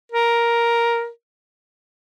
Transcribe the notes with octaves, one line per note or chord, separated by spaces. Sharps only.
A#4